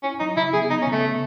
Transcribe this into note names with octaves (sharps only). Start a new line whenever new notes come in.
C#4 E4
F#3 D#4
C#3 E4
B3 G#4
B3 D#4
C#4
C#3
A3